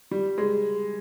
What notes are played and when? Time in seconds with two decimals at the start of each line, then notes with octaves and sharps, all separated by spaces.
0.11 G3
0.38 G#3